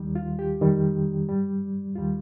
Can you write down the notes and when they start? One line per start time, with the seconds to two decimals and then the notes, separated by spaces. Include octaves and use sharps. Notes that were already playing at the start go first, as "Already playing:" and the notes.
Already playing: D#2 D#3 G3
0.15 F4
0.39 G4
0.61 F2 D#3 G3
1.29 G2 G3
1.95 D#2 D#3 G3 F4